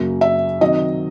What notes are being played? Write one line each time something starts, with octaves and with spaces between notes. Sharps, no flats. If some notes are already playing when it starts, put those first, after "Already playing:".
Already playing: F#2 C#3 F#3 A#3
E5
C3 D#3 F#3 D#5